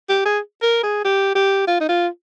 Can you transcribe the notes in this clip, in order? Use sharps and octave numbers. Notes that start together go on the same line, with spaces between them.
G4
G#4
A#4
G#4
G4
G4
F4
D#4
F4